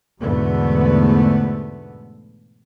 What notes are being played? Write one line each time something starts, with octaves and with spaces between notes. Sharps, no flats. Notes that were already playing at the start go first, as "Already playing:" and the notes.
E2 G#2 B2 D3 A3 B3